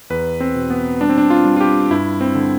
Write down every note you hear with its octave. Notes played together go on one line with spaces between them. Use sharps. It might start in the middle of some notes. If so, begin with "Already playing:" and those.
E2 B4
C4
B2
B3
G3 D4
C4
D4
F4
G3
F4
G4
G2 E4
C4
D3